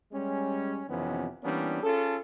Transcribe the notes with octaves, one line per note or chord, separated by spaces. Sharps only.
G3 G#3 C#4
F2 C3 D#3 E3 B3 C#4
E3 G3 A#3 B3 C#4 D4
C#4 F4 G#4 A4